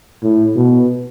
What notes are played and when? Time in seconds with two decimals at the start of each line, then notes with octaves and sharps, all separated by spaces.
0.22 A2
0.56 B2